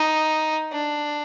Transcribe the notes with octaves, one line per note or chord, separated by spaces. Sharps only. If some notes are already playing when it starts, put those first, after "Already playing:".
Already playing: D#4
D4